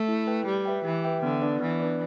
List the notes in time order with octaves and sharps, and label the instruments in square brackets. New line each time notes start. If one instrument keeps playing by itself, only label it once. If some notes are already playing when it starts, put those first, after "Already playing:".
Already playing: [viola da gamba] A3
[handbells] E4
B4 G5
[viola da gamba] G3 [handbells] G4
[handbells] B4 E5 G5
[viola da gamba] E3 [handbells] G4
[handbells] B4 E5 G5
[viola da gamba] D3 [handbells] B3
[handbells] D4 B4 D5
[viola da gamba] E3 [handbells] B3
[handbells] D4 B4 D5